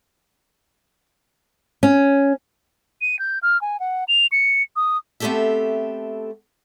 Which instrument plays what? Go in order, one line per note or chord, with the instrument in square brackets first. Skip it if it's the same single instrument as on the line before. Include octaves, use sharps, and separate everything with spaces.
[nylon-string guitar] C#4
[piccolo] D#7
G6
F6
G#5
F#5
F7
C#7
D#6
[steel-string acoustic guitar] A3 B3 C4 G4 A4 E5